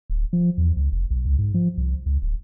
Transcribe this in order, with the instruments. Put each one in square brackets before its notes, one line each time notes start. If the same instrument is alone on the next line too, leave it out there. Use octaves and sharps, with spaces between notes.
[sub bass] D1
F3
E2
C#2
F1
B1
C#2
G#2
F3
C2
C#2
D1